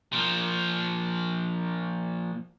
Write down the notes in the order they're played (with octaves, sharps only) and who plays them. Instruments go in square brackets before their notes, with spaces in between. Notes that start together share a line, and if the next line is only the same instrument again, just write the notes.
[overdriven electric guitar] A#2 F3